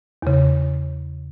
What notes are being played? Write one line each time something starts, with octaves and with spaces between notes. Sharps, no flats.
E2 C#3